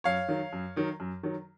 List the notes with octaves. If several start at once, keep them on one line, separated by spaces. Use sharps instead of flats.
F#2 C#5 F5
D#3 F#3
F#2
D#3 F#3
F#2
D#3 F#3